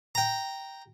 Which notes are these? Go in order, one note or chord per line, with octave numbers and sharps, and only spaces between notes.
G5 A#5